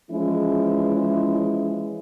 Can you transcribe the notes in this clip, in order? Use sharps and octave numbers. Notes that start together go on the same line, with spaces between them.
E3 F3 G#3 C#4 E4